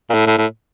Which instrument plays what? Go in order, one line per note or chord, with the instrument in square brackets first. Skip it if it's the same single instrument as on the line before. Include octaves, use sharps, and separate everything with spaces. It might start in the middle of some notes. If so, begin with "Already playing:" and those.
[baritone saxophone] A#2
A2
A2
A2